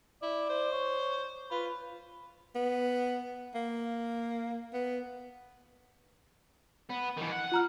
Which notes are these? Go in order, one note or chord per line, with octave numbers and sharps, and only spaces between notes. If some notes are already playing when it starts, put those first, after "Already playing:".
E4 D5
C5
C#5
F4 B4
B3
A#3
B3
B3
D#3 E3
F#5
F4 A#5 F6